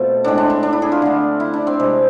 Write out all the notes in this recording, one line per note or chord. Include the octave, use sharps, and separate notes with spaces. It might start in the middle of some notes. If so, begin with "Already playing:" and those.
Already playing: B2 A3 C4 F4 A4
A2 G#3 D4
D4
D4
D4
E4
G#4
F4
D3 A3
E4
D4
C4
C3 G#3